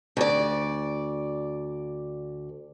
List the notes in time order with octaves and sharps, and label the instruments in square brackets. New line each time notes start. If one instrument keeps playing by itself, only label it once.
[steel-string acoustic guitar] D2 D5